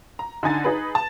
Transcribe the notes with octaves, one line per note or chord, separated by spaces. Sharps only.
A#5
D3 D#4 G#5 A6
D#4 G#4 B4
A5